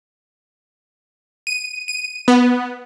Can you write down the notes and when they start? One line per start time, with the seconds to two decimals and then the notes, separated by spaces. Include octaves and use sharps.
1.47 D#7
1.88 D#7
2.28 B3